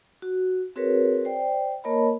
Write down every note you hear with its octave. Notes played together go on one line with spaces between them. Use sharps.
F#4
C4 F#4 G#4 A#4 B4 C#5
C5 D5 G5
A#3 A#4 C#5 D#5 A5 B5